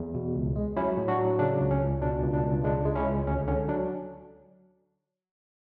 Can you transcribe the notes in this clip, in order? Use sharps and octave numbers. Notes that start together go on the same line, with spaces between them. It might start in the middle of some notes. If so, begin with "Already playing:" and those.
Already playing: E2
B2
C#2
G#3
F#3 C#4 E4
A2
D4 F#4
F#3
C#3 D4
C#2
C#4
C#2
B2 D4
C#2
D4
C#2
G#3 D4
G#3
C#4 E4
C#2
D2 C#4
D3 C#4
F#3 D4